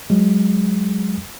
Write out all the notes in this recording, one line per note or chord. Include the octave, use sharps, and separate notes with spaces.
F#3 G#3